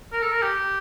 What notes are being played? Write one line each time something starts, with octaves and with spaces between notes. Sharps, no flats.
A#4
A4
A#4
G4